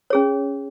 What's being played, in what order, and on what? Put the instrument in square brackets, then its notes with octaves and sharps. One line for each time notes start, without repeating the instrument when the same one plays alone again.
[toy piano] C#4 G#4 C#5